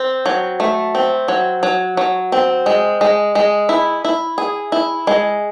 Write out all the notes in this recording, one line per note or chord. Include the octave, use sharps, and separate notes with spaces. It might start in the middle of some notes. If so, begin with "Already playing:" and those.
Already playing: C4
F#3
A3
C4
F#3
F#3
F#3
C4
G#3
G#3
G#3
E4
E4
G#4
E4
G#3